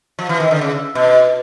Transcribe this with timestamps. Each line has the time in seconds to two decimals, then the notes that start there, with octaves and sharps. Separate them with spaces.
0.19 F3
0.29 E3
0.40 D#3
0.51 D3
0.61 C#3
0.95 B2